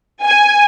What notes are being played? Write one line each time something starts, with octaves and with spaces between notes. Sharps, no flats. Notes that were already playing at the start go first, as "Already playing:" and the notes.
G#5